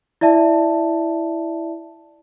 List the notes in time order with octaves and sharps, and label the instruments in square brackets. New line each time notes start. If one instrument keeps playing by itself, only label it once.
[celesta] E4 D5 E5 A5